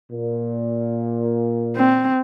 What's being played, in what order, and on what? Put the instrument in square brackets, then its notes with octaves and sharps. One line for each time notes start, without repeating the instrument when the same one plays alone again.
[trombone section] A#2
[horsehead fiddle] C4